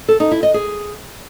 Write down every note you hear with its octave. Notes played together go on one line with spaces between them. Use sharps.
A4
D#4
E4
D#5
G#4